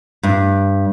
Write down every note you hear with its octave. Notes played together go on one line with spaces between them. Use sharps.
G2